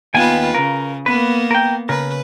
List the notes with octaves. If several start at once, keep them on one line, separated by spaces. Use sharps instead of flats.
D#2 B3 F4 B4 G5 G#5
C#3 A#4
A#3 B3 B4
A#4 G5
C#3 A#4 B4